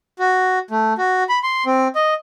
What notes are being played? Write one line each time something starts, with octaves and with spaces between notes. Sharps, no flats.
F#4
A3
F#4
B5
C6
C4
D#5